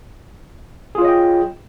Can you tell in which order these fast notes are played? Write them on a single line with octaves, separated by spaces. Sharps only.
G#4 F4 C#5 D#5 G5